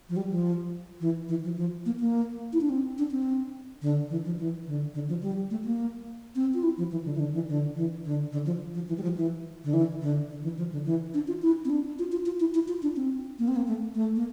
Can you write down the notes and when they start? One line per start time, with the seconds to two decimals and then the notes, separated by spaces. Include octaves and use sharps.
0.09 F3
0.16 G3
0.31 F3
1.00 E3
1.28 E3
1.44 F3
1.57 F3
1.86 A#3
2.00 A#3
2.53 E4
2.61 D4
2.69 C4
2.98 D4
3.12 C4
3.82 D3
4.10 E3
4.25 F3
4.39 E3
4.67 D3
4.94 D3
5.09 F3
5.22 G3
5.50 A3
5.65 A#3
6.36 C4
6.54 F4
6.63 E4
6.78 F3
6.91 E3
7.05 D3
7.15 E3
7.19 D3
7.34 E3
7.49 D3
7.76 E3
8.05 D3
8.32 D3
8.46 F3
8.74 F3
8.88 E3
8.98 G3
9.03 F3
9.17 E3
9.64 D3
9.73 E3
10.02 D3
10.30 D3
10.43 E3
10.58 F3
10.72 D3
10.86 E3
11.14 D4
11.28 F4
11.42 E4
11.65 C4
11.70 D4
11.99 F4
12.12 F4
12.26 F4
12.40 E4
12.54 E4
12.68 F4
12.82 D4
12.96 C4
13.39 A#3
13.48 C4
13.56 A#3
13.68 A3
13.95 A3
14.16 A#3